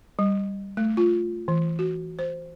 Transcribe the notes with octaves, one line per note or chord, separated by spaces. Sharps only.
G3
A3
F4
E3
F#4
C5